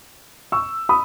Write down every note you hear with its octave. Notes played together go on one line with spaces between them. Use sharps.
C#6 E6
B5 D#6